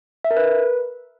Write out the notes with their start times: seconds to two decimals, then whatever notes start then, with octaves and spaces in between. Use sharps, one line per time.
0.25 E5
0.31 A#4
0.37 B4